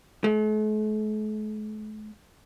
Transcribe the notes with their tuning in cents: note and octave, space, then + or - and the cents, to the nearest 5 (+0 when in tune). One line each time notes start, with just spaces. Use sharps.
A3 -45